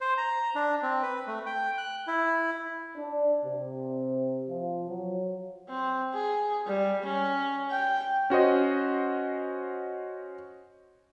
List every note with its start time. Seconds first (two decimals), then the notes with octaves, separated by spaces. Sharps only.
0.01 C5
0.17 A#5
0.55 D4
0.83 C4
1.02 B4
1.27 A3
1.46 G5
1.78 F#6
2.07 E4
2.97 D4
3.44 C3
4.50 F3
4.88 F#3
5.69 C4
6.14 G#4
6.67 G3
7.05 C#4
7.71 G5
8.30 C#4 F#4 C5 D#5